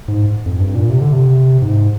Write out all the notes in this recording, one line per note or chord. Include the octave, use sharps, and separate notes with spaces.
G#2
F2
G2
A#2
C3
D3
C3
G#2